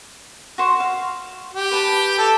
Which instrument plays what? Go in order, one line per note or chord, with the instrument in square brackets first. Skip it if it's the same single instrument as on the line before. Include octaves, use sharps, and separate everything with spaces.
[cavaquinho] F#4 C5
F5
[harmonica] G4
[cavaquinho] B4 A5
[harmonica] A4 A5